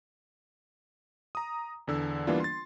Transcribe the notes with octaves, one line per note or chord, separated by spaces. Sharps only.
A#5 D#6
E2 D3 E6
E3 G3 A#3 B3 D4 F4
C6 A6